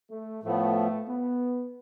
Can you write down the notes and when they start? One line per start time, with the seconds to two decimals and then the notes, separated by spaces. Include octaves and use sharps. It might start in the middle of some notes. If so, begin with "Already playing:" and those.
0.11 A3
0.43 A2 F3 A3 B3
1.07 B3